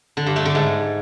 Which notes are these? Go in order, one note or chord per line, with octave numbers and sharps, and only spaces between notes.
D3
G2
A3
D3
G#2